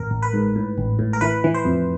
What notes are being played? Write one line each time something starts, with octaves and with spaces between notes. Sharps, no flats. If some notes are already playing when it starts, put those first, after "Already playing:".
Already playing: A1 A#4
A1
B4
G#2
A2
A1
A2
A#4
E3 B4
E3
C5
F2